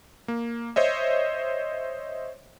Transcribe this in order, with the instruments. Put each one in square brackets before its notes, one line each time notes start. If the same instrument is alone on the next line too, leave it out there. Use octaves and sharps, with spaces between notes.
[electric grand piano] A#3
C5 C#5 D#5 E5